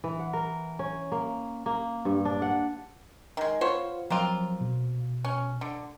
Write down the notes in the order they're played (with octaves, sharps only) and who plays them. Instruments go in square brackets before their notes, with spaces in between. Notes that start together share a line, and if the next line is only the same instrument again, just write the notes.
[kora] E3
F#5
A#4
C#4
A#3
A#3
G2
D4
F#5
[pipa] D#3 G#3
[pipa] B3 C5 C#5 [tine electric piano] F4 F5
[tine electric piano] F3 F#3 [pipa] A#3 C4 F4
[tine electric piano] B2
[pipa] C#4
D3